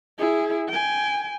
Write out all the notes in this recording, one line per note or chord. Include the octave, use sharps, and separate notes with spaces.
E4 G#4
G5 G#5